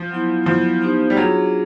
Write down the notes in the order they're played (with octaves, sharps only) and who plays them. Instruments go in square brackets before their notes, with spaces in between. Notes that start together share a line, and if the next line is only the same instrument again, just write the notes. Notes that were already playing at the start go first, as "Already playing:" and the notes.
Already playing: [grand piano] F3
[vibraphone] F#3 B3 E4
[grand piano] F3 [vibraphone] F#3 B3 E4
[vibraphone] B3 D#4 G4 C5
[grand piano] G3
[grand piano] F#3 [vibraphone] D4 F4 G#4 C#5